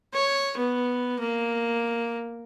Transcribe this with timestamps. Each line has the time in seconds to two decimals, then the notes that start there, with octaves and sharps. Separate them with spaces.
0.13 C#5
0.57 B3
1.19 A#3